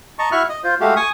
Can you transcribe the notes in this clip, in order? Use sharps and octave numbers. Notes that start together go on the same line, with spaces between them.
D#5 A5 A#5 C#6
E4 F#4 E5 C#6 F6 F#6
D#5
F4 C5
G#3 A3 F#4 G4 F5
G#5 C#6 D#6